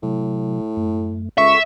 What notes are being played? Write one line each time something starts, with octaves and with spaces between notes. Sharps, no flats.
A2 C3 F#3
F#2 A3
C#2 A4 E5 F#5 C#6